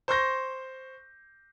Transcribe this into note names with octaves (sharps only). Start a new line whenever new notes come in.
C5 C6 C#6 G6 A#6